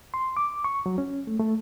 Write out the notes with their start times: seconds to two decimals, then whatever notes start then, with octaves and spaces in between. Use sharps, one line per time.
0.14 C6
0.37 D6
0.64 C#6
0.86 F#3
0.98 C#4
1.27 A3
1.40 A3